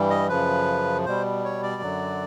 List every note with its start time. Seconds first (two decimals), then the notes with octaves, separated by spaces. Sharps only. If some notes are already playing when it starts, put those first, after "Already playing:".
Already playing: G2 E3 G3
0.10 D#5
0.29 F#2 C#3 F3 B4
1.05 B2 G3 C5
1.44 C#5
1.63 D5
1.82 F#2 D3 F#3